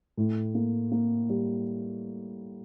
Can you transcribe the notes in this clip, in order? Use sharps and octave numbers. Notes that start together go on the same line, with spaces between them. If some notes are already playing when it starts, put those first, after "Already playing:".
A2
A#3
A#3
G3